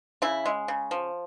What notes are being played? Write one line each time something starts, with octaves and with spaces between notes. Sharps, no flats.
C#3 E4
G#3
C#3
F3